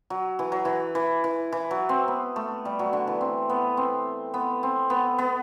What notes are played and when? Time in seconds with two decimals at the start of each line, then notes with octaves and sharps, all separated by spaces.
0.10 F#3
0.39 E3
0.52 F#3
0.65 E3
0.95 E3
1.24 E3
1.52 E3
1.71 F#3
1.89 C4
2.08 B3
2.36 A3
2.65 G3
2.79 F#3
2.93 D3
3.07 E3
3.21 C4
3.49 B3
3.77 C4
4.34 B3
4.63 C4
4.90 B3
5.18 B3